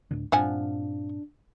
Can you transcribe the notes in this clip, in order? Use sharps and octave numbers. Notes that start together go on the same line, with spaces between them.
D2 A2 D3
G2 A#2 F3 C4 D4 F#5 G#5